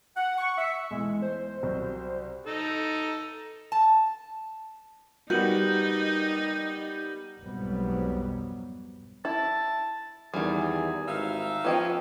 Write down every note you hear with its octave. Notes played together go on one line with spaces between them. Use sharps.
F#5
C#6
E5
B1 E3 G#3
C5
C2 F#3
D#4 A4
A5
G3 B3 D#4 F#4 A#4 G6 D#7 F#7
B1 F2 G#2 F#3 G3 B3
E4 A5
E2 D#3 G3 G#4
G#1 D#4 E5 F5
F3 B3 C#4 D#5 G5